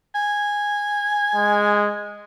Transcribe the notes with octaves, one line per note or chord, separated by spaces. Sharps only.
G#5
G#3